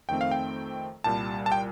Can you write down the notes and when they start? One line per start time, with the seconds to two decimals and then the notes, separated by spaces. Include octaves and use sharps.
0.09 F2 D#3 A3 C4 G5
0.21 F5
0.31 G5
1.04 C2 A#2 G3 A5
1.46 A5
1.52 G5